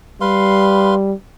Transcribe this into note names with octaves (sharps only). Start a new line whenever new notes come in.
G3 B4 F5 C6